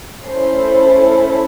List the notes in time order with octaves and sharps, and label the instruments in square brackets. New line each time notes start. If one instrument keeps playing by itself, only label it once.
[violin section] A3 C#4 E4 A4 C5